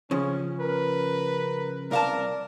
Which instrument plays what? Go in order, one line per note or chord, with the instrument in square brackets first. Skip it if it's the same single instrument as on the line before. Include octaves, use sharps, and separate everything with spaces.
[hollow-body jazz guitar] C#3 F3 [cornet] C#4
[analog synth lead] A#4 [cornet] B4
[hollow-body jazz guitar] C2 F5 A5 [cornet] A#4 [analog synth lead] D5